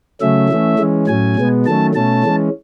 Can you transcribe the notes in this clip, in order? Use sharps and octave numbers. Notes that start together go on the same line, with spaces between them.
C#3 F#3 A3 C#4 E5
E3 A3 C#4
E3 G#3 C#4
A2 F#3 C#4 G#5
B2 G#3 B3
D#3 F#3 A3 C#4 A5
B2 A3 C#4 A5
E3 G#3 C#4